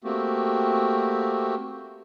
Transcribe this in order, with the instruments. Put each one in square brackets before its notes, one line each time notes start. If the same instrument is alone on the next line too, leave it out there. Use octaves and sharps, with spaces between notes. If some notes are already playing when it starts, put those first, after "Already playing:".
[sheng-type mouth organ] A3 A#3 C4 F#4 G4